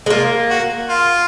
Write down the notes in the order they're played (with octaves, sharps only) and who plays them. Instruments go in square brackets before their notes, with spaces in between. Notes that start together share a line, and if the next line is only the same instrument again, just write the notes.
[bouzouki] G#3
[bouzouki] A#3 [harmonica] F4
[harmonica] F#4
F4